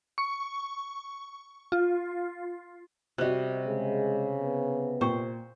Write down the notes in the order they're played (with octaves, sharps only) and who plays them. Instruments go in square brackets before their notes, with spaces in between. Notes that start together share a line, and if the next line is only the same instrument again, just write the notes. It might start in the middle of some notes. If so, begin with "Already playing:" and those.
[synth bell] C#6
F4
[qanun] C3 G3 [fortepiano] F#4 D#5 F#6
[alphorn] C#3 [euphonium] G#3
[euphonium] B3
[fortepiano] A#2 G5 C#6 [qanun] C5